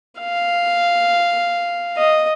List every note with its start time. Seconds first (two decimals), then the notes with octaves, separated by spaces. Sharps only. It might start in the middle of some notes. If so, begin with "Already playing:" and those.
0.20 F5
1.97 D#5